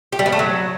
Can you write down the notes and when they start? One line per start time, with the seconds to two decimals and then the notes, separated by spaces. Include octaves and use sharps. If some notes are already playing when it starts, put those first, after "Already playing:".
0.12 G4
0.19 G3
0.26 B3
0.32 A3
0.39 F#3